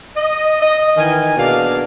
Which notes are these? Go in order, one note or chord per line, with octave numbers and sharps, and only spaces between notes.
D#5
D#5
D#3 E3 G#5
B2 A#3 D4 G#4 D5 F5